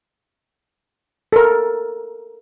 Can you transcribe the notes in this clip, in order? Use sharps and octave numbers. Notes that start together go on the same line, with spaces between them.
A4 A#4